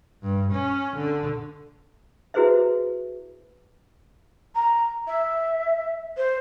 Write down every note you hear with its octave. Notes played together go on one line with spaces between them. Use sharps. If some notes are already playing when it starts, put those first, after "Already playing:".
G2
C#4
D3
E4 F#4 G#4 B4 C5 E5
A#5
E5
C5